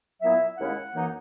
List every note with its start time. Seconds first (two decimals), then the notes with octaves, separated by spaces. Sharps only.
0.21 A#2 F#3 B3 E4 E5
0.57 D#2 C#3 G#3 C#4 E4 F#5
0.93 F#2 E3 A#3 D#4